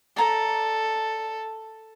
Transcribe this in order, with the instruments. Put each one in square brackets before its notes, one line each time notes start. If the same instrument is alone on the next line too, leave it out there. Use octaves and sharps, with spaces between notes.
[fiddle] A4 [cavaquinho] D5 A#5